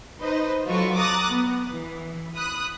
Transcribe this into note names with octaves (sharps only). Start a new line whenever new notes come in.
D#4 B4 C5 D#5
F#3 F4 F#4 A4 B4 C#6
A#5 D6 D#6 F#6 A6
B3
E3
B5 D#6 F#6